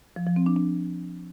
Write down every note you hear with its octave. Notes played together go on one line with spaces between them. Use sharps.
F3
F3
C4
D4
D4